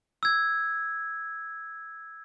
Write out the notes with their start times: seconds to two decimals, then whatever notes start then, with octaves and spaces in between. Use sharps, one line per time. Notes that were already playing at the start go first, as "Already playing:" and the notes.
0.23 E6 G#6